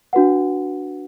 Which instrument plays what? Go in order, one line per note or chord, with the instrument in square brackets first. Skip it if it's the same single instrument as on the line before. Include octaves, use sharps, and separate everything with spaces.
[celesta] D4 F#4 B4 F#5